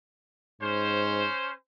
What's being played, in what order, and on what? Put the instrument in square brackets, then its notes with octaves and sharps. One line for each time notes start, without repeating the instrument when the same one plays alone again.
[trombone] G#2 [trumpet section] C#4 C5